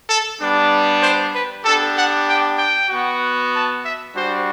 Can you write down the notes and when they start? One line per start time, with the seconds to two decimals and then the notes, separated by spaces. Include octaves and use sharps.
0.08 A4
0.39 G3 B3 D4
1.02 C5
1.34 B4
1.64 B3 D4 G4 A4
1.96 F#5
2.27 G5
2.58 G5
2.90 B3 F#4
3.53 A5
3.84 E5
4.15 G3 D4 F#4 C5